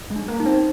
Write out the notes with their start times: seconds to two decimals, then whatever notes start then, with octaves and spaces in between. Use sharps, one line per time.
0.10 G#3
0.16 D4
0.28 A#3
0.40 D#4
0.46 C4